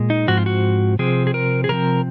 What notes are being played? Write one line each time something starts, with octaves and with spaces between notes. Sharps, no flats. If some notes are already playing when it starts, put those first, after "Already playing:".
Already playing: A#2 G#3
D#4
G#2 F3 C4 F#4
F4
F#4
C3 F3 C4 G#4
G#4
A#4
G#4
C3 F3 C4 A#4